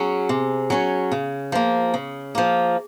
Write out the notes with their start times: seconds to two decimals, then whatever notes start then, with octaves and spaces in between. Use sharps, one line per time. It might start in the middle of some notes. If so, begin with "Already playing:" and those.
Already playing: F#3 C#4 G#4
0.29 C3
0.70 F#3 C#4
1.12 C#3
1.52 F3 A#3
1.94 C#3
2.35 F3 A#3